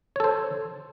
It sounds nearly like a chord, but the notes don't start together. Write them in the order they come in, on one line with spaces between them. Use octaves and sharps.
C#5 A4 C5